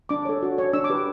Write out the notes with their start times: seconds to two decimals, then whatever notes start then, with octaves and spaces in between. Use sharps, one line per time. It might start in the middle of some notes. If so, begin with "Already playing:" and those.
0.09 D4 D6
0.25 A4 C#5
0.42 F#4
0.58 C#5
0.73 D4 E6
0.84 D6
0.90 G4 B4